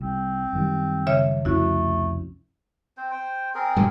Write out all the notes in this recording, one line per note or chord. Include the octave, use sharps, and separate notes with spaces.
C2 C4
F#2 D#3 G3
C#3 C#5 E5
C2 F2 A3 C#4 E4 F#4
C4 C5
C5 G5
C4 G#4 A#4
G2 A#2 D3